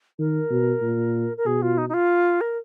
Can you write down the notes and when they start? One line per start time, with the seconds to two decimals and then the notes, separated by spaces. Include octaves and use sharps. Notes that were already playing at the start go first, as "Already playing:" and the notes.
0.19 D#3 A#4
0.51 B2
0.82 A#2
1.37 A#4
1.46 B2 G#4
1.62 F4
1.78 D#4
1.89 D#4
1.94 F4
2.41 A#4